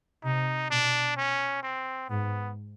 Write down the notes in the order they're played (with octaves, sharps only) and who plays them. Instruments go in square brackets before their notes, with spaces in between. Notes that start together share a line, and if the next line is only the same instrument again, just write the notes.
[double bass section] C3 [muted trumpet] D#4
[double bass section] B2 [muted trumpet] D4
[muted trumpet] C#4
C4
[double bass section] G#2 [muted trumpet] B3